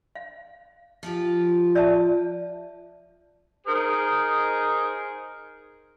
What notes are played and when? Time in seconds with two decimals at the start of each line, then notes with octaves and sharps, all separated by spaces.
0.15 F5
1.03 F3 F4 G4
1.75 D5 E5 A5
3.67 D#4 G#4 A#4 C5